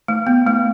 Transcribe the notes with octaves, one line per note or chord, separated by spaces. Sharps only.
A3
B3
A3